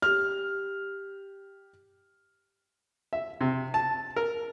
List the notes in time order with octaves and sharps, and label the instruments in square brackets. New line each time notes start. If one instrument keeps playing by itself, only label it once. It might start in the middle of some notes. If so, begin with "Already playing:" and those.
[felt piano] G4 F6
[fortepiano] E5
C3
A5
A#4